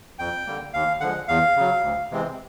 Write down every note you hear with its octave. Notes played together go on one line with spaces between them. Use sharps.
F2 G5
D3 G3 A#3
D#2 F5
D3 F3 G#3 F#5
E2 F5
C#3 F#3
D2
C3 E3 G#3 C4